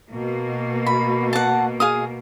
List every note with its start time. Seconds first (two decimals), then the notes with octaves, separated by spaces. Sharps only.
0.12 B2 A#3 B3
0.86 B5
1.33 F#5 A5
1.80 G#4 F5 D#6